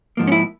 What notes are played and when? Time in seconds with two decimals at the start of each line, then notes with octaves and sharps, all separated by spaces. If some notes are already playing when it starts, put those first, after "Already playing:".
0.17 G#2 F3 A#3
0.27 C#4
0.32 E4